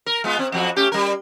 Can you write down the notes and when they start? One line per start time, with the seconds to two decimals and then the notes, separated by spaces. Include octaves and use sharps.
0.06 A#4
0.24 G#3 B3 F4
0.39 C4
0.52 F2 F3 F#4
0.76 A3 C#4 G4
0.92 G3 A#4